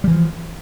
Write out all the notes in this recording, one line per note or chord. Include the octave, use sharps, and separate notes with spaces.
E3 F3 G3